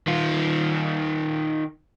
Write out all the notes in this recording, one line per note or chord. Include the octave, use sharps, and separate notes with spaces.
D#3 F4